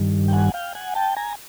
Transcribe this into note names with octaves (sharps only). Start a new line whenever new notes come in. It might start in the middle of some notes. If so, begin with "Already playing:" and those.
Already playing: G2 D#3 G3
G5
F#5 G#5
F5 G5
F#5 G#5
G5 A5
G#5 A#5